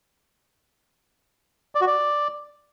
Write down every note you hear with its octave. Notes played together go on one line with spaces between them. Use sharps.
D5
F#4
D5